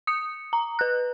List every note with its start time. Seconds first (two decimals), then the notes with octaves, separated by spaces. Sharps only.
0.07 D#6 C#7
0.53 A#5
0.79 B4 F#6